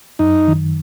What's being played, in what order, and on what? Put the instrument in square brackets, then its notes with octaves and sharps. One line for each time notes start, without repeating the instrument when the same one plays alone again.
[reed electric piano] F#2 [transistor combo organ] D#4
[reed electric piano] D#3